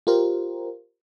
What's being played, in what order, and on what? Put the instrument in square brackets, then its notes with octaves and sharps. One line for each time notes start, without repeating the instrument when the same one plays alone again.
[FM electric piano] F4 G4 A#4 C5